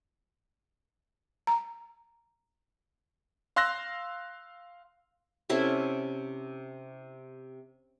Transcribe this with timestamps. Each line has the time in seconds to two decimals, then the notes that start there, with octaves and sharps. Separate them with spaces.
1.47 A#5
3.56 F5 C6 E6 F#6 A#6
5.49 C3 C#4 E4 A4